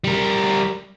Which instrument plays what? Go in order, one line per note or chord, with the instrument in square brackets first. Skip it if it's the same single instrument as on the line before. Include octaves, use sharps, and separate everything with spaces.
[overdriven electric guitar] G3 A#4